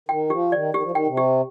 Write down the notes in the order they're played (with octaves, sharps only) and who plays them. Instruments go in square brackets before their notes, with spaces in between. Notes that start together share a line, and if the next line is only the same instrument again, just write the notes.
[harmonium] D#3 [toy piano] G5
[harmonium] F3 [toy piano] G4
[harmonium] D#3 [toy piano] D5
[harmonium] D#3 [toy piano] G4
[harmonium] F3
[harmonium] D#3 [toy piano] G5
[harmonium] C3
[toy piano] G4